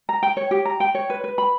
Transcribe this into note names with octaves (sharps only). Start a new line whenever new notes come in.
A#5
G5
C#5
G4
A#5
G5
C#5
B4
B4
B5